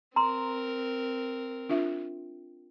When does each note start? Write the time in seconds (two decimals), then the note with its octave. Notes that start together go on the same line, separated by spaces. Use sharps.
0.16 C4 A#4 A#5 C6
1.69 D4 F4 E5